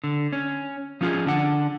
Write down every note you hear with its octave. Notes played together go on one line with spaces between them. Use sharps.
D3
C#4
F3 C#4 F4 F#4 G#4
D3 D4 F#5